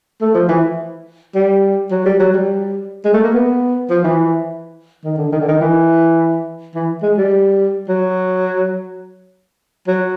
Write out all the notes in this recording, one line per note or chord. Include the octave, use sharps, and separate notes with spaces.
A3
F3
E3
G3
F#3
G3
F#3
G3
G#3
A3
A#3
B3
F3
E3
D#3
D3
D#3
D3
D#3
E3
E3
G#3
G3
F#3
F#3